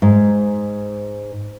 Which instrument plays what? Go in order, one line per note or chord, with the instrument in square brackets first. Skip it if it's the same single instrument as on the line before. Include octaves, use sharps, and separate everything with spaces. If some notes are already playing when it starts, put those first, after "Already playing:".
[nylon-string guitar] G#2